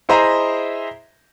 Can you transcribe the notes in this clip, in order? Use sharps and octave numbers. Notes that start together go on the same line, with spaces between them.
E4 G#4 C5 D#5 E5 A#5